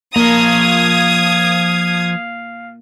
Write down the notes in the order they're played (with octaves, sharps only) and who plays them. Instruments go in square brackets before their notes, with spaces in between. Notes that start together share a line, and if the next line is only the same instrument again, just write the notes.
[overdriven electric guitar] F3 A#5 [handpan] A#3 [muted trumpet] F5 [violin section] D#6 G#6